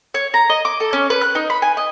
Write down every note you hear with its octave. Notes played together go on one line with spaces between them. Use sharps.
C#5
A#5
D#5
D6
A4
C#4
B4
F#6
D#4
B5
G#5
D#5